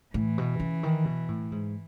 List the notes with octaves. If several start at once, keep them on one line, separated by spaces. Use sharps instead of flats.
A2 E3
B2
C#3
D#3
B2
A2
G#2